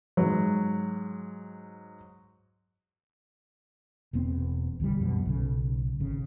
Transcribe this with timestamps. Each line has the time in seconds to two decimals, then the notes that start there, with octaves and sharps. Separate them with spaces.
0.17 G#2 F#3
4.13 E1 E2 B3 C4
4.80 D1 C2 E3 G3
5.00 F#2 B2 G3
5.26 B1 C#3
6.00 G#1 C#3